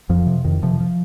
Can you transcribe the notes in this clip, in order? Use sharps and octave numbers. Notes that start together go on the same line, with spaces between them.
F2 F3
C3
F2 D#3
C3 F3
F3